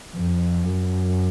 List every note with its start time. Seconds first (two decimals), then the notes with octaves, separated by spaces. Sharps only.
0.15 F2
0.63 F#2